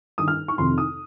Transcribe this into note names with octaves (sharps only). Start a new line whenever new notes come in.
G2 D#3 D#6
F6
C#6
F2 C3 D#3 C6
D#6